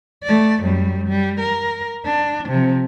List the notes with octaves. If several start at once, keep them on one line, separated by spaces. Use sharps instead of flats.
A3 D5
F#2 G3
G3
A#4
D4
C3 F3